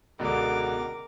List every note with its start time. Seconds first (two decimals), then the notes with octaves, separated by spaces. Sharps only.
0.19 C#2 B2 D3 A#4 D6